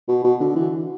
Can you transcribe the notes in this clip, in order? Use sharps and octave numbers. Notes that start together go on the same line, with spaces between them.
B2
B2
D3
E3